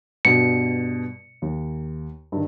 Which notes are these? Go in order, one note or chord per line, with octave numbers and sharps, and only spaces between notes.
G2 B2 C#7
D#2
G2 D#3